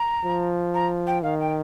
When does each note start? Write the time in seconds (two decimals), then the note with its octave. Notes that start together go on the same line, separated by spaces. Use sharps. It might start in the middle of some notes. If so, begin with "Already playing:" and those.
Already playing: A#5
0.25 F3
0.74 A#5
1.07 G5
1.23 D#3 F5
1.40 G5